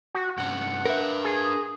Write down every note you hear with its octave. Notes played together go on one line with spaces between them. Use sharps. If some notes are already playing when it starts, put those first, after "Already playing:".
F#4
G2 C3 C#4 F#5
D4 A#4 B4 E5
G#4